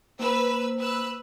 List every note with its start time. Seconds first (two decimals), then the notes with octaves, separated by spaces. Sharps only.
0.19 A#3 B4 C5 E6
0.78 B4 E6 F#6